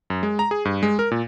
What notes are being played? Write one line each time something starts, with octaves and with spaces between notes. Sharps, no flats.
F#2
G#3
A#5
G#4
G2
G#3
A#4
A#2